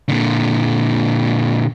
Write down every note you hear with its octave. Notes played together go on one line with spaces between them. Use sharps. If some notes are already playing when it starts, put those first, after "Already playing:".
A#2 D3